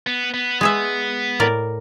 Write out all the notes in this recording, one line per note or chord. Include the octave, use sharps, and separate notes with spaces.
B3
B3
G#3 G#4 E5
A2 A#4 D5